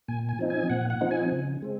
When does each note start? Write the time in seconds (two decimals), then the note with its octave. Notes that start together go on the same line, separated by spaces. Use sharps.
0.08 A#2 G#5
0.29 G#5
0.39 F3 C4 D#4
0.50 G#5
0.69 A#2 F#5
0.90 F#5
1.01 F3 C4 D#4
1.11 G#5
1.32 C#3
1.62 G#3 C4